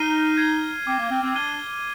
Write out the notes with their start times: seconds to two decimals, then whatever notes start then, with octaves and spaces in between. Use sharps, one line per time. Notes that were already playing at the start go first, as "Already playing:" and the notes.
Already playing: D#4 F6 C7 D#7 G7
0.37 G#6 C7 D#7 G7
0.86 C4 D6 F6 C7
0.99 A#3
1.11 C4
1.23 C4
1.34 D4 F6 G#6 D#7 G7